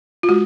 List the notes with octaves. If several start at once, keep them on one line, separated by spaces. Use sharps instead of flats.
F4
G#3 F#4